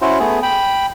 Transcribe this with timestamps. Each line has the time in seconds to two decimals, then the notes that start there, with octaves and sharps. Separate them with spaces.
0.01 C#4 E4 F#4 C5
0.20 A3 B3 G#4
0.43 G5 B5